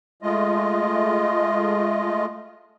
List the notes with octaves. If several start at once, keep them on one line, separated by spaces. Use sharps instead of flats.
G#3 A3 F4 D#5